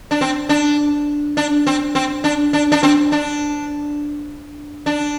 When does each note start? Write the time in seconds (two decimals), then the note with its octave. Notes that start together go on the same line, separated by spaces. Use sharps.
0.11 D4
0.21 C4
0.49 D4
1.37 D4
1.67 C4
1.95 C4
2.24 D4
2.53 D4
2.72 D4
2.83 C4
3.12 D4
4.86 D4